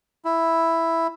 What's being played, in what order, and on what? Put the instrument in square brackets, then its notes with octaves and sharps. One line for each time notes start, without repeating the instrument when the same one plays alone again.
[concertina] E4